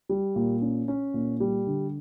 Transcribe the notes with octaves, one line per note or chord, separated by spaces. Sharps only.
G3
A#2
C#4
C#4
A#2
G3
D3